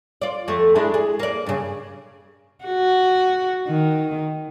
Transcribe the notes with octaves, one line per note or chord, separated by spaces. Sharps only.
F4 D5
F2 A3
G#3 D4 E4
G#4
A#3 D5
G2 C#3
F#4
D#3